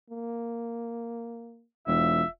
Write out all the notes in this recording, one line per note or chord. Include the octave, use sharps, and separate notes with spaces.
A#3
E1 F4 E5